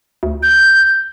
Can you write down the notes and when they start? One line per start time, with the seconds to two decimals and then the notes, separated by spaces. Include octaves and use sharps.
0.23 D2
0.43 G6